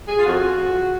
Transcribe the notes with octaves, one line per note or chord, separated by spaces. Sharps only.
G#4
F4
F2 F#4